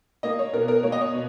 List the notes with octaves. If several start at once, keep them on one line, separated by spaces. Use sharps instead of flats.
A#3 D#5
C#5
B2 A#4
A#4
A#3 C#5
D#5
C#5
B2